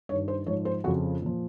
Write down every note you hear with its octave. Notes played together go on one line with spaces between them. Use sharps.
G2 D#3 C#5
C5
G#2 F3 C#5
C5
F2 C#3 F3 F#4
A#2 F3